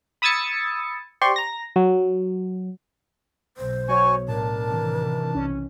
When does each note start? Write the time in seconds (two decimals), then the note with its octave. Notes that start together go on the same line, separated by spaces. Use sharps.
0.22 B5 D#6 E6 G#6 A6 C#7
1.21 G4 C5 D5 C6 C#6
1.36 A#5 A#6
1.76 F#3
3.57 B1 C5
3.88 F#3 F#4 C#5 G#5 C#6
4.28 A2 D4 A#4 A5
4.66 C3 D#3 E3
5.35 B1 C#4